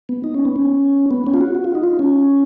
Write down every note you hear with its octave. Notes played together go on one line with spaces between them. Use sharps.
B3
D#4
C#4
B3
C#4
B3
C#4
F4
F#4
F#4
F4
D#4
F4
C#4